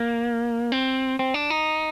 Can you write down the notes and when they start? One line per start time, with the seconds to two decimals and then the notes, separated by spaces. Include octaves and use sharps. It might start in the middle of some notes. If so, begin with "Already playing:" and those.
Already playing: A#3
0.72 C4
1.19 C4
1.34 D4
1.50 D#4